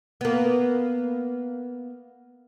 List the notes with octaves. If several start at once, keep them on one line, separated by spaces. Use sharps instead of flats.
A#3 B3